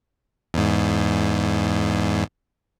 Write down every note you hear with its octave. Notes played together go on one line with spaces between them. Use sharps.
E2 G#2